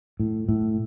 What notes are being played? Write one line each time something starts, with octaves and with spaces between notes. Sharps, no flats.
A2
A2